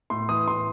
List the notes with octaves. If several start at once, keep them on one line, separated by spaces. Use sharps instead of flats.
A2 C6
E3 D#6
A2 C6